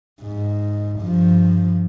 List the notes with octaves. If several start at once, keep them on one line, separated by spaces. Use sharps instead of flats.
G#2
G2 F3